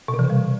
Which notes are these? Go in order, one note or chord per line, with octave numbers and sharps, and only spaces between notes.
B2
C3
E3
C#3
G3